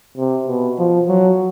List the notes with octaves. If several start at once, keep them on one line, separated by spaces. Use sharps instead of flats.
C3
B2
F3
F#3